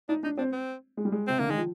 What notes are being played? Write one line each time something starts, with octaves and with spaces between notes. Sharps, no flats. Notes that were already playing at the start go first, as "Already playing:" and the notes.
D4 D#4
D4 D#4
C4 D4
C4
G#3
G3
G#3
C3 C4
D3 A#3
D#3 G#3
F3